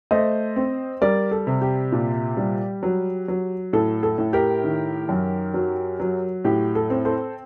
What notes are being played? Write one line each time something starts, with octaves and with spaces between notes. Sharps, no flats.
A3 C5 D#5
C4
G3 A#4 D5
A4
C3
G4
A#2
G3
F#3
F#3
A2 A4
A4
A2
G4 A#4
D#3
F#2
F#3
F#3
A2 G4
A4
C4
A4 C5